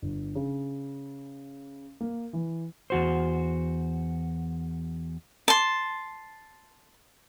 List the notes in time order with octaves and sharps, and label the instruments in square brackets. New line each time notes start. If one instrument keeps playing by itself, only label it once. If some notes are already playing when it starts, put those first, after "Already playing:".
[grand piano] G1
C#3
A#3
E3
[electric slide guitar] E2 F#4 C5
[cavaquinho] A5 C6